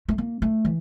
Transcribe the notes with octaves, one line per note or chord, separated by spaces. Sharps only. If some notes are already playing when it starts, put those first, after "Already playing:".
A3
A#3
A3
E3